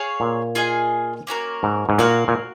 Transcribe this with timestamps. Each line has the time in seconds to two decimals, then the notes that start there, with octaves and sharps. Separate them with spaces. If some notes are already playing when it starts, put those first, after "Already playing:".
Already playing: G#4 C#5 F5
0.20 A#2
0.55 F4 G#4 D#5 G#5
1.27 A#3 C#4 F#4 A#4
1.63 G#2
1.89 G#2
1.98 A#2 F#4 A#4 F5
2.28 A#2